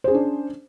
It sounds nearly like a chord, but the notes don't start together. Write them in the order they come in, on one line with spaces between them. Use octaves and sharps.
C5 G#4 C#4 D4